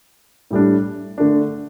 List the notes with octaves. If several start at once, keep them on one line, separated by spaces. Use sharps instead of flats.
A2 G3 D4
D3 A3 D4